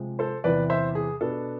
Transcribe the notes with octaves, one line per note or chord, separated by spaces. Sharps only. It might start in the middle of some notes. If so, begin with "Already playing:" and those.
Already playing: C3 F3 G#3
A4 C5
E2 C3 E3 B3 B4 D5
C5 E5
G#4
B2 B3 D4 A4